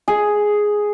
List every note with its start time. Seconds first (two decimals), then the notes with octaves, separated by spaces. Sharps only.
0.08 G#4